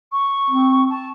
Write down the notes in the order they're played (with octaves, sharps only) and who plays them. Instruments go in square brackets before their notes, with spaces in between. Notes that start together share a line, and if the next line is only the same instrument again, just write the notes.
[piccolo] C#6
[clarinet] C4
[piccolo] A5